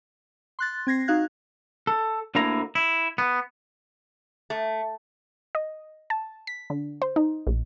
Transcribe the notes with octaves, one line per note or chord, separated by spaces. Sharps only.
C6 F#6 A6
C4 G#6 A#6 C7
D#4 F#4 F5 F#6 G#6
A4
D2 D3 A#3 E4 A#5
E4
B3
A3
D#5
A5
B6
D3
C5
D#4
A#1